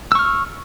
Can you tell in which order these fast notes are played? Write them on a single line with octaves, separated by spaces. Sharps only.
E6 C#6 F6